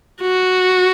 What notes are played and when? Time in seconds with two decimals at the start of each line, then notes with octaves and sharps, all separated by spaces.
0.21 F#4